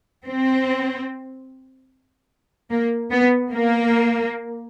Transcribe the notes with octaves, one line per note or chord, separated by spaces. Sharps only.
C4
A#3
B3
A#3